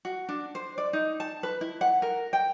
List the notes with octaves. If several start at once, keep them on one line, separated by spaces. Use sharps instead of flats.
F#4
D4
C5
D5
D#4
A5
B4
E4
F#5
A#4
G5